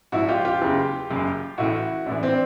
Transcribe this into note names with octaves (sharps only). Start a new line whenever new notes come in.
A#1 G#2 F3 E4 F#4
F4 G4
F4 G4
F#1 E2 C#3 E3
F#1 F#2 C#3
A1 A2 E3 E4 F#4
A#1 A2 E3 D4 E4
C4 D4